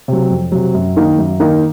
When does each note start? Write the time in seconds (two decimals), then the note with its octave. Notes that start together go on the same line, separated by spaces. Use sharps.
0.08 C3 F#3
0.30 F2
0.52 C3 F#3
0.75 F#2
0.96 D#3 A#3 D#4 A#4
1.18 F#2
1.40 D#3 A#3 D#4 A#4